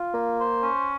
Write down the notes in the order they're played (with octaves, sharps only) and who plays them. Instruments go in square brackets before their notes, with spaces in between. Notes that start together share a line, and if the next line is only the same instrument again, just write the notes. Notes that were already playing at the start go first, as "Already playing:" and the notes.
Already playing: [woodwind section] F4
A#3
C5
C#4